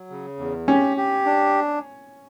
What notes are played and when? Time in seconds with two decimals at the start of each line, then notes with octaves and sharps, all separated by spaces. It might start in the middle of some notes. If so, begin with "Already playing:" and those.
Already playing: F#3
0.10 C#3
0.39 E2
0.68 C#4 G4
0.97 G4
1.26 D4